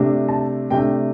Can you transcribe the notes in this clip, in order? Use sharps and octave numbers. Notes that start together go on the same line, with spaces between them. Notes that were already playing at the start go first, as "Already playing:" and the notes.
Already playing: C3 A3 D4
A5
C3 A3 D4 G5